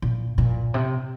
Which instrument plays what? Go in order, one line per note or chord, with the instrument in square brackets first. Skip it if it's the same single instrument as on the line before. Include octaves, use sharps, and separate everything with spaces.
[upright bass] A#2
A#2
C3